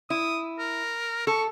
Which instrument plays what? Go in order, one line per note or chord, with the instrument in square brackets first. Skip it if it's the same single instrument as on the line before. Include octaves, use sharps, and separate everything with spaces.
[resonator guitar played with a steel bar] E4 [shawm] D#6
[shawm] A#4
[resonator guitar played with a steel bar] A4 [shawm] C#6